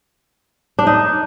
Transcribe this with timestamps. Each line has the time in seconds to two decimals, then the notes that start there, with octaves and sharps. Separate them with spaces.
0.79 D4
0.87 D#4